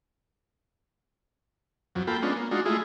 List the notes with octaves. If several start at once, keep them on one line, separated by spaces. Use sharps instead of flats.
F2 F#3
A#3 F4 A4 G5 B5
G#3 B3 C#4 D4 F4
A#3
G#3 D4 D#4 F4 F#4
G#3 A3 E4 F4 G#4